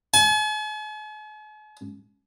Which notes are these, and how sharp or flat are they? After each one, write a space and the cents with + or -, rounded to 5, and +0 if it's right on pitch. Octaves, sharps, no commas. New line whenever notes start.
G#5 +45